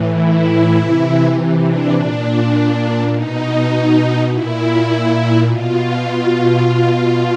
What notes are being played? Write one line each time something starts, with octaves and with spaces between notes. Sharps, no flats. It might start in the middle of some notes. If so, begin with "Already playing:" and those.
Already playing: A2 E3
E4
C3 E3
D4
A#2 D4
B2 D#4
A#2 E4
B2 F4
B2